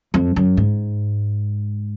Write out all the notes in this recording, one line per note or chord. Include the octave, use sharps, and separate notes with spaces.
F2
F#2
G#2